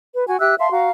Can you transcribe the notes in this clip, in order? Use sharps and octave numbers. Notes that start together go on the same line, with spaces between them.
B4
F#4 G#5
G4 E5 E6 F#6
E5 F5 A5 C6
F#4 F5 A#5